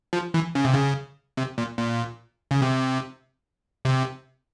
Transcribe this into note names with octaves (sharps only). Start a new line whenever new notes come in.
F3
E3
C#3
C3
C#3
C3
A#2
A#2
C#3
C3
C3